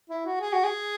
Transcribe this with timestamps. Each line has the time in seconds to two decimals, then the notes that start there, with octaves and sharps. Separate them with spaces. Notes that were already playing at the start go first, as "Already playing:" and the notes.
0.10 E4
0.26 F#4
0.41 G#4
0.53 F#4
0.64 G#4